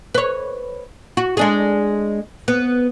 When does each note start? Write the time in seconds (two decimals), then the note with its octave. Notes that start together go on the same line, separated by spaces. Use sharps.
0.15 B4 C#5
1.17 F#4
1.37 G#3 D4 G#4
2.48 B3